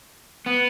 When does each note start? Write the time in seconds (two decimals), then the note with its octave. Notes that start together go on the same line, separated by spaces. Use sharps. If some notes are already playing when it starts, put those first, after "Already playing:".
0.46 B3